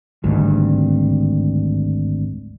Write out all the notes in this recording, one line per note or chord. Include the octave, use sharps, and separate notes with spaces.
G#1 D2 G2